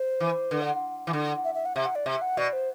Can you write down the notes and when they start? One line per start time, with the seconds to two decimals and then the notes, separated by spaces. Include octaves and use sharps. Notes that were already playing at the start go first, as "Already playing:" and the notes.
Already playing: C5
0.20 E3
0.51 D3 B4
0.62 F#5
1.07 E3
1.13 D3
1.44 E5
1.55 E5
1.66 F#5
1.76 C3 E5
1.85 F#5
1.95 D5
2.06 C3 E5
2.22 F#5
2.37 B2 D5
2.53 C5